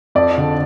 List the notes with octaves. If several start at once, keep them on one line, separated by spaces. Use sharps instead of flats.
F2 D5
D3